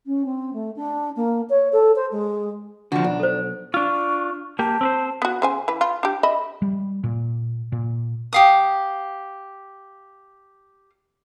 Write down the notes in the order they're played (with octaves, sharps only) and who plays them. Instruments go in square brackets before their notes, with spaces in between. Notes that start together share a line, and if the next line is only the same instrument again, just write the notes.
[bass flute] C#4
C4
A3
D4
A#3
C#5
A4
C5
G#3
[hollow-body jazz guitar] D3 F3 [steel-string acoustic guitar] F#4
[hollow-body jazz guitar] B1 [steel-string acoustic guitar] D4
[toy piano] A4 C5
[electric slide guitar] D4 F4 [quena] C#6
[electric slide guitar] A#3 G4 [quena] A5
[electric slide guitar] C4 B4 C5
[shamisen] B3 F#4
C#3 C5 G#5
E3 B4
F4
D4 G4
D#5 E5 B5
[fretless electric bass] G3
A#2
A#2
[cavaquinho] G4 F5 D#6